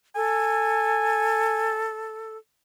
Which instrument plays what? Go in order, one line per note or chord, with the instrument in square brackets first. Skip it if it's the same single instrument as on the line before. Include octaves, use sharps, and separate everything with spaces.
[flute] A4 [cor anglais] G#5